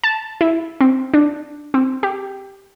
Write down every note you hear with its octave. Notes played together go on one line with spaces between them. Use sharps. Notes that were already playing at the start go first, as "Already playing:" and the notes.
A5
E4
C4
D4
C4
G4